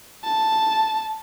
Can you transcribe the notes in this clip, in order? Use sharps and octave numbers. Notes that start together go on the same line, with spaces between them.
A5